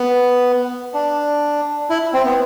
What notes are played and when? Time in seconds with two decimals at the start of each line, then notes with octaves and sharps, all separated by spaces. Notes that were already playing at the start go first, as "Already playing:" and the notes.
Already playing: B3
0.94 D4
1.90 E4
2.14 C4
2.25 B3